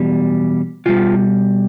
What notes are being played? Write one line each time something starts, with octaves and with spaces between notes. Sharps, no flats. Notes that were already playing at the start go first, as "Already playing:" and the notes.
Already playing: E2 B2 G3
B2 G3 F4